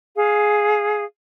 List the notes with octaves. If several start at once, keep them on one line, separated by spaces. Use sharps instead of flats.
G#4 F5